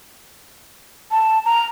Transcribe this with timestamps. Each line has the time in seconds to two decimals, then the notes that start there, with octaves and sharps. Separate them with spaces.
1.11 A5
1.45 A#5